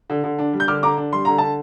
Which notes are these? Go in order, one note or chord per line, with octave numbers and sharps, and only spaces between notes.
D3
D3
D4
G3
G6
D3 D6 F6
D3 A#5 D6
D4
G3 C6
D3 A#5
D3 A5